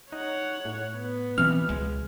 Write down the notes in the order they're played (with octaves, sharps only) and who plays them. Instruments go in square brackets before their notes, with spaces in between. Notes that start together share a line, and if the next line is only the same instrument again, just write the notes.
[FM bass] D#4 [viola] C#5 F#5
[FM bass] A2
[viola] B3
[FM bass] B2 [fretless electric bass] E3 C4 [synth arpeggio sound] F6
[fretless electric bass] C#2 G#3